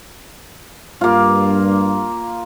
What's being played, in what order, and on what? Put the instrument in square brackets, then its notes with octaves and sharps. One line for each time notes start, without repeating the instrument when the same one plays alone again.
[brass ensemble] G2 [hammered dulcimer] A#3 F4